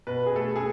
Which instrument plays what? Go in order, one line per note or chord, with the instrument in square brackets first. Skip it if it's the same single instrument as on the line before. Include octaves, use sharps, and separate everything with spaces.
[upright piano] B2 B4
G#4
A3 A4
G#4